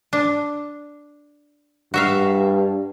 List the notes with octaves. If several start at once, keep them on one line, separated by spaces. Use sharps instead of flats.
D4
G2 F#4 E5 F5